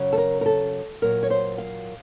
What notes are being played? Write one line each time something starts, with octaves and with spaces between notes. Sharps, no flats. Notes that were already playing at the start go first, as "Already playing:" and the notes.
Already playing: F#2 C#3 F#3
A4
A#4
A#4
A4
A#2 F#3 A#4
C#5
C5
F5